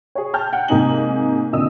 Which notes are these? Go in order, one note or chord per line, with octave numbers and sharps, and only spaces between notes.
G#4 C#5
G5 A5 F6 G6
F#5 G5
G#2 C3 A#3 D#4 G#5 F#7
F2 A#2 D3 D#5 D#6 E6